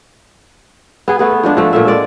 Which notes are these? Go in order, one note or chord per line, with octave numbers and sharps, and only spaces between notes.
B3 G#4
A3 B3 G#4
F3 G#3 D4
F3 A3
A#2 A3 E5
G#3 D5